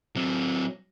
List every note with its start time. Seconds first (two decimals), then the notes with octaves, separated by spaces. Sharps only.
0.16 F#3 C4